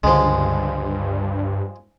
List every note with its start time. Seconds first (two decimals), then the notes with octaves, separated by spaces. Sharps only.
0.04 C#2 G2 D3 F3 G#3